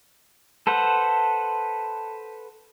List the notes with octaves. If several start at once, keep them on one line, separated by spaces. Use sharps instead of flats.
A4 B4 C5 F#5